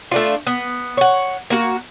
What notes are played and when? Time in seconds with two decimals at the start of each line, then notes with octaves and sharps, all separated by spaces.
0.11 A3 D4 F4
0.47 B3
0.97 C#5 F#5
1.50 A#3 F#4